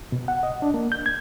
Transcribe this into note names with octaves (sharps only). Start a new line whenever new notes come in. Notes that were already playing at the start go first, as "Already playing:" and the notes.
B2
F#5
D#5
D4
A#3
G6
G#6